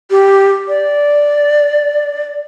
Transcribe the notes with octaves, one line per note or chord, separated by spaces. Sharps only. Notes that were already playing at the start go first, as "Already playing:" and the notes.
G4
D5